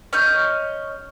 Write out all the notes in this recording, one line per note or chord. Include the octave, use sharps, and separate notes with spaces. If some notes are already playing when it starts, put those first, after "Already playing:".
C#4 C#5 D#5 G6